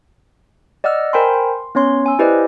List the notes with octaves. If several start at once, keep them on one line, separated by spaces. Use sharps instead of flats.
D5 D#5 F#5 E6 F6
A#4 C5 G5 G#5 B5 C6
C6
B3 C#4 C#5 C6
G#5 E6
E4 G4 B4 C5 D5 D#5